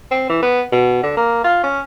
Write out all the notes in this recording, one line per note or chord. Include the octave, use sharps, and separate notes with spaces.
C4
E3
B3
B2
D3
A#3
F4
C#4